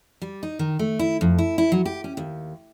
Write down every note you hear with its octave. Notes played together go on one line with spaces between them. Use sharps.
G3
D#4
D#3
A3
E4
F2
E4
E4
F#3
G4
C#4
D#2